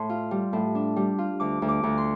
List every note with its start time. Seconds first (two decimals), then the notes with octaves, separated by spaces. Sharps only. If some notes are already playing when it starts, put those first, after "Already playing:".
Already playing: A2 C6
0.10 F4
0.31 G3
0.53 A2
0.75 D4
0.96 G3
1.18 F4
1.40 D2 D6
1.62 D2
1.68 D6
1.83 D2
1.98 C6